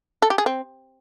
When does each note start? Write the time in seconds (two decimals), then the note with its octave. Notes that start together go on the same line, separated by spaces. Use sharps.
0.22 A4
0.30 G4
0.38 G#4
0.46 C4